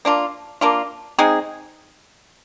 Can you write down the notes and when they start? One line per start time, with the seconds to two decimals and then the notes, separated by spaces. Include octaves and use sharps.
0.05 A#3 D4 F4
0.61 A#3 D4 F4
1.19 G#3 C4 D#4 G#4